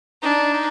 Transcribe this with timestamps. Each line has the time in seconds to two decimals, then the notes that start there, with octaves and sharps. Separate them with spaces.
0.22 D4 D#4
0.53 D#4